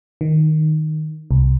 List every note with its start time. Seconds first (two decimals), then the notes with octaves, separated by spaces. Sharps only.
0.21 D#3
1.31 C2